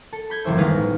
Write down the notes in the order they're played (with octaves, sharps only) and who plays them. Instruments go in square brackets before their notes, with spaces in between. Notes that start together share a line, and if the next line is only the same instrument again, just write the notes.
[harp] A4
B5 G6 G#6
F#1 C#2 E3 C5 E5
G1 D#3 G#3 B4 F5 A#6
A1